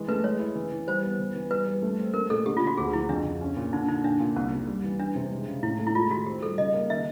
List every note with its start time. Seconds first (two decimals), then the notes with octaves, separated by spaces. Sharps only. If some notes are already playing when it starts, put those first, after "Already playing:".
Already playing: E3 G#3
0.08 A3 B4
0.24 G#3 C#5
0.39 E4
0.56 E3
0.72 E3
0.87 G3 C5
1.03 B3
1.19 E3
1.35 E3
1.51 G3 B4
1.67 G3
1.82 A3
1.98 C4
2.14 A3 A#4
2.30 A#2 A4
2.46 D3 G4
2.57 F4
2.62 D3
2.67 F#4
2.77 D2 G#4
2.93 F3 E4
3.09 F2 D4
3.25 C#3
3.41 C#4
3.56 A#2
3.73 D3 D#4
3.88 D3 D#4
4.04 A#2 D4
4.20 A#2
4.36 C2 C#4
4.52 C2
4.67 G3
4.84 E3
4.99 E3 D4
5.15 C3
5.31 G#3
5.47 C#3
5.63 A2 E4
5.79 A3
5.87 E4
5.95 G#3 F4
6.10 D#3 F#4
6.26 C4 G4
6.42 G3 A4
6.58 C#3 D#5
6.74 A#3
6.89 D#3 E5